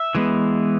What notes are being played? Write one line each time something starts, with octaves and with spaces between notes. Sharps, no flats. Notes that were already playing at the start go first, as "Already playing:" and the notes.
Already playing: E5
E3 G#3 B3